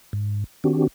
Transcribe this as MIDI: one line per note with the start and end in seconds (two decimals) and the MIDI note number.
0.13 0.44 44
0.64 0.87 51
0.64 0.87 60
0.64 0.87 62
0.64 0.87 66
0.64 0.87 67